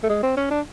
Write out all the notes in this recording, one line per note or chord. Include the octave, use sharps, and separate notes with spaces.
A3
G#3
C4
C#4
D4